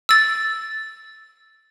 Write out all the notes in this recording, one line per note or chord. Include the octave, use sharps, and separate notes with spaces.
E6 A6